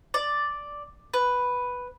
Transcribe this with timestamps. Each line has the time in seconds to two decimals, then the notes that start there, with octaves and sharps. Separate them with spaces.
0.14 D5
1.14 B4